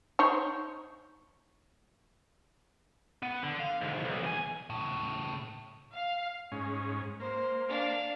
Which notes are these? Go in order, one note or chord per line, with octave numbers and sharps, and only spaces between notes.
D#4 C5 C#5
B3
D3
F5
D2 G#2
B1
E2 G#5
A2 C#3
F5
G#2 C#4
A#3 C5
D4 F5